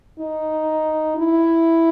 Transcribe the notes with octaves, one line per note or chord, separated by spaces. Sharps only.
D#4
E4